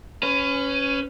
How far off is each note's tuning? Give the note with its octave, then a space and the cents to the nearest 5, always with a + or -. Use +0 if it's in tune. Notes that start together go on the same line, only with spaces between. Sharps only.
C#4 +0 B4 +30